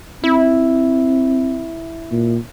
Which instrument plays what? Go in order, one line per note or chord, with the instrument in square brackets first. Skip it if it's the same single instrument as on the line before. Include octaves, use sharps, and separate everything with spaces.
[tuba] C4 [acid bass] E4
[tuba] A#2